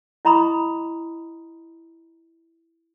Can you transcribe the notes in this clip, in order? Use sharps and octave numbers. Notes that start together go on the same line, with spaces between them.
E4 D#5 A#5 B5 C#6 D#6